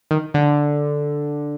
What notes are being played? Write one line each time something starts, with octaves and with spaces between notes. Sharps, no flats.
D#3
D3